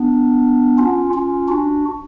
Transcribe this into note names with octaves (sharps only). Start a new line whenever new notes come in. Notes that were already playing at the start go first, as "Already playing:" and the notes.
Already playing: B3 D4
C#4 F4
C#4 F4
D4 F#4